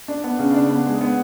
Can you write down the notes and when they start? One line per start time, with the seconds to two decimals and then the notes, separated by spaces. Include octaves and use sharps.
0.08 D4
0.24 B3
0.39 C#3
0.54 D4
0.70 B3
0.86 G#3
1.01 B3